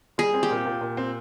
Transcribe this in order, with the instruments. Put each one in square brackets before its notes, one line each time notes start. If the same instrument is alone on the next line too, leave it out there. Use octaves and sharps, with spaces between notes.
[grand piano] G3 [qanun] G#4
[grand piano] C4
[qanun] G4
[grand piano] A#2
A#2
A#2
C4